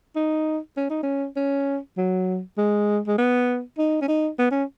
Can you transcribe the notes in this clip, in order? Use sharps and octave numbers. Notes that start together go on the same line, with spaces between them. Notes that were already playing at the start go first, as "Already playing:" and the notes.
D#4
C#4
D#4
C#4
C#4
F#3
G#3
G#3
B3
D#4
C#4
D#4
B3
C#4